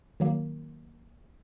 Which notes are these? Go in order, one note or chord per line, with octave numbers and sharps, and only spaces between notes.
D#3 F#3 A#3